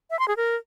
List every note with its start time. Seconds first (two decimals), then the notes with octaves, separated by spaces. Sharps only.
0.11 E5
0.19 C6
0.28 G#4
0.37 A#4